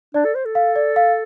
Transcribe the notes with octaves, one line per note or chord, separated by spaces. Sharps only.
D4 D5
A4
C5
A4
F5
D5
F5